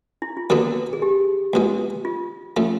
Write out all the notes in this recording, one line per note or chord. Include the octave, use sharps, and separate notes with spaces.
E4
F4
D#2 D3 F#3 B3 D4 F#4
G#4
G4
C#2 B2 G#3
F4
C#3 F3 A3